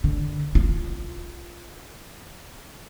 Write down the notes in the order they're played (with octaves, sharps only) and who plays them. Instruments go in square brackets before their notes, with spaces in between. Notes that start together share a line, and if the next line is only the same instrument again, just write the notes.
[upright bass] D3
F4